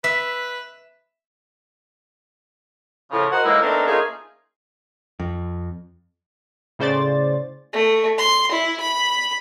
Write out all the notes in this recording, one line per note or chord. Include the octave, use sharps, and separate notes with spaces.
B4 E5
A2 C#3 F3
F#4 A#4 C5 D#5 F#5
A2 E3 G#3 A#3 D#4 E4
A3 B3 C4 D4 D#4 A#4
A3 A#3 C#4 D#4 F4 G#4
F2
A2 C#3 C5 D5 A6
A3
C6
E4
B5